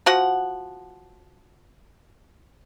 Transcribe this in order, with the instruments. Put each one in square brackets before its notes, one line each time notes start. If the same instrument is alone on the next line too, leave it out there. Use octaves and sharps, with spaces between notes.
[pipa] F3 F#4 F#5